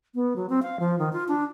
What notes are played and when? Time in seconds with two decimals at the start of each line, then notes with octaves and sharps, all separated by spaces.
0.15 B3
0.36 F#3
0.50 C4
0.63 F5
0.80 F3
0.99 D#3
1.13 F4
1.28 D4